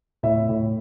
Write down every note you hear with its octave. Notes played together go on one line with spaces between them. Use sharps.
A2 E5
A2